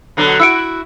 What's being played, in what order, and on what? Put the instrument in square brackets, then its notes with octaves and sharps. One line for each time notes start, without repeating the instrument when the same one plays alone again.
[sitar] B2 D3 F#3
[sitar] E4 F#4 [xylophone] E6 C#7 D7